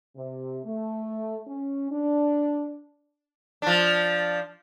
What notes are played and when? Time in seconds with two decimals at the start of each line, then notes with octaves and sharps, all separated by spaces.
0.16 C3
0.65 A3
1.48 C#4
1.92 D4
3.62 F3 D4